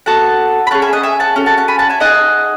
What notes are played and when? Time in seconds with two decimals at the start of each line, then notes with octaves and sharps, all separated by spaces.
0.06 B3 F#4 A4 F#5 A5
0.67 B5
0.71 C#4 G#4 F#5 A5
0.82 E5 G#5
0.93 D#5 F#5
1.03 E5 G#5
1.20 F#5 A5
1.36 C#4 F#4 A4
1.46 F#5 A5
1.57 F#5 A5
1.68 G#5 B5
1.79 F#5 A5
1.89 E5 G#5
2.00 D#4 G#4 D#5 F#5